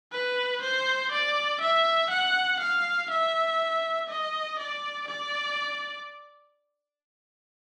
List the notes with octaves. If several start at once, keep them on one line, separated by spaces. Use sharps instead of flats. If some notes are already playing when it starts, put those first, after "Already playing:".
B4
C5
D5
E5
F#5
F5
E5
D#5
D5
D5